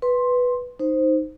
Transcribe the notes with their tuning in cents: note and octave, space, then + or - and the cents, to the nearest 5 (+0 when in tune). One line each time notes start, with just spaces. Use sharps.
B4 +0 C6 +10
D#4 +0 C5 +0